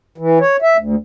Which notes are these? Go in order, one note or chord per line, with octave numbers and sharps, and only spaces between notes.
E3
C#5
E5
D2